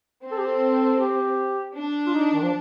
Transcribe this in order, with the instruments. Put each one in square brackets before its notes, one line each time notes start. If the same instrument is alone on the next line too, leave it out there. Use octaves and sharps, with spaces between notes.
[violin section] C4
[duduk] A4
G4
A4
G4
[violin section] D4
[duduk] F4
D#4
D#3
F3